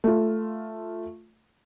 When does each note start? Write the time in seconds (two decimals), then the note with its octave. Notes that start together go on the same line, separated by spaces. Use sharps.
0.04 A3 F4